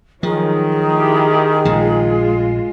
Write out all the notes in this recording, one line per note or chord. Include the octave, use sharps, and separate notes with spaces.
D#3 F3 F#3 G#4
E4 G4
A#1 C#3 G#3 F4